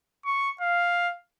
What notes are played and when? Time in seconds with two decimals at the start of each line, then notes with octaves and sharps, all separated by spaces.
0.26 C#6
0.61 F5